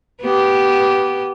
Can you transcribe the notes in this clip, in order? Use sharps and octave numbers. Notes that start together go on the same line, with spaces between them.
B3 G4